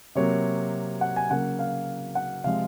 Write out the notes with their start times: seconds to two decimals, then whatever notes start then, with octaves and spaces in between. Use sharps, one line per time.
0.15 C3 F#3 A#3 C#5
1.01 F#5
1.16 G#5
1.30 C#3 F#3 A#3 F#5
1.59 F5
2.15 F#5
2.44 C3 F3 G#3 F5